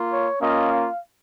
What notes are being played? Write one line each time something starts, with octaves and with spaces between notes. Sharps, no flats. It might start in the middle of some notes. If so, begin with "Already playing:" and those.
Already playing: A#3 F4
C#5
A#3 C#4 F4 D#5
F5